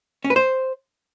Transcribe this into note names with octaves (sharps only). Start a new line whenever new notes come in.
C#4
B4
C5